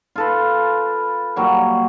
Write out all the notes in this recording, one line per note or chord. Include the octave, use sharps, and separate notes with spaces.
F4 A4 B4
A#2 F#3 G3